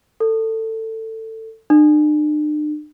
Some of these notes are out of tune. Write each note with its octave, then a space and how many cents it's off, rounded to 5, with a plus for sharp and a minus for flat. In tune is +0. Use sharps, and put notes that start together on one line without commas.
A4 +20
D4 +45